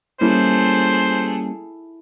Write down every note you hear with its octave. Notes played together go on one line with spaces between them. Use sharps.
G3 A3 A#3 C#4 E4 G#4 C5